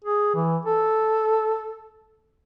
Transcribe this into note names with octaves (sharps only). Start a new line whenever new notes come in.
G#4
E3
A4